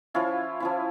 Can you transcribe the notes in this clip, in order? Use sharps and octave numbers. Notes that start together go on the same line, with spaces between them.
F3 C#4 E4 F4
F3 C#4 E4